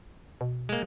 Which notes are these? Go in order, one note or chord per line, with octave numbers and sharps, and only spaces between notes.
B2
G#3 A#3